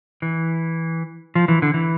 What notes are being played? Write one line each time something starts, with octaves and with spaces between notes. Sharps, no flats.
E3
F3
E3
D3
E3